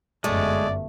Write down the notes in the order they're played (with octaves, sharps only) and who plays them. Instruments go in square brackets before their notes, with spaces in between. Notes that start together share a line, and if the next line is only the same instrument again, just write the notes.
[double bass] G1 F#2 [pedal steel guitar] G#3 [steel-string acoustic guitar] A3 [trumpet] D5